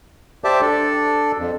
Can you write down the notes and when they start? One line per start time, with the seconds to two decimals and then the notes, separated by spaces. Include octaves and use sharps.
0.44 G4 C5 D5 E5 A5 D6
0.61 D4 A4 D5
1.38 F2